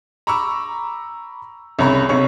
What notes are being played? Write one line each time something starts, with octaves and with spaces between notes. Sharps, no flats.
A#5 B5 C#6 D6 E6
C2 C#3 C#5 A#5 B5 C#6
B1 C3 C#5 C#6